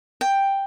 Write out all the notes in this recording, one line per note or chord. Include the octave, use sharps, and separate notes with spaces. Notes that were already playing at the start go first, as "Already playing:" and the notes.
G5